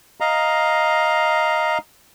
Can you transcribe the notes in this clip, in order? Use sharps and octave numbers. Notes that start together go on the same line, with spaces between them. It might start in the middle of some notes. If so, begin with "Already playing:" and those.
D#5 F5 A#5